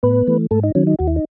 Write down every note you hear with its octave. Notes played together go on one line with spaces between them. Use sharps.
A2 B3 B4
E3 A3
G#2 A3 A4
D#4
D#3 F#3 C#4
D#4
D#2 F#4
E4
D#4